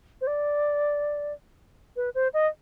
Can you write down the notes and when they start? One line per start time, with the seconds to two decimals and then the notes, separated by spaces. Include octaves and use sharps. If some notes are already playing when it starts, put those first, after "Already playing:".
0.21 C5
0.27 D5
1.96 B4
2.15 C5
2.33 D#5